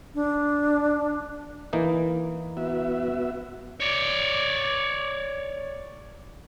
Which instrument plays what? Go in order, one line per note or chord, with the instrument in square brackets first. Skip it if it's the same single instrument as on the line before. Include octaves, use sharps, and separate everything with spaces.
[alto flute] D4
[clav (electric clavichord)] E3 A#3 D#4
[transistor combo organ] B3 F#4 E5
[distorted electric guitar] C#5 D5